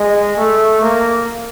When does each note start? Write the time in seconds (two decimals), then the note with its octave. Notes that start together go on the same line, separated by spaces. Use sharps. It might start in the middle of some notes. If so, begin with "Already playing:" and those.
Already playing: G#3
0.37 A3
0.82 A#3